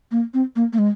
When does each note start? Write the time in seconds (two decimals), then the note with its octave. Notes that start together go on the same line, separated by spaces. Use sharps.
0.12 A#3
0.34 C4
0.56 A#3
0.73 A#3
0.78 G#3